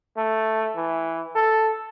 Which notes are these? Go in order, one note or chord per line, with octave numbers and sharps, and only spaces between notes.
A3
E3
A4